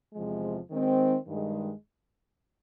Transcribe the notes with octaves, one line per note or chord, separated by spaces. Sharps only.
E2 C3 F3 G#3
D#3 G#3 C4 D#4
G2 D#3 G#3